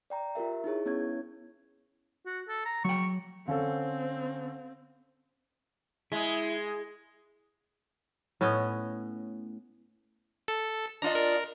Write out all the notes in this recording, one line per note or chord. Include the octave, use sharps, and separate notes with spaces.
D5 G5 A#5
F4 G4 A#4 E5
D#4 E4 G#4 C#5
B3 C#4 E4 C#5 G#6
F#4
A4
A#5
F#3 G5 C#6
D3 C4 C#4 A4 F5
G#3 E4
A2 B3 C#4 D#5
A4
D4 F4 D#5 A#5
A#4